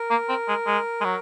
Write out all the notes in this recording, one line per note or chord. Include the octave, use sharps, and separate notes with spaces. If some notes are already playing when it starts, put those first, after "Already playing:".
Already playing: A#4
A#3
C4
G#3
G#3
G#3
F#3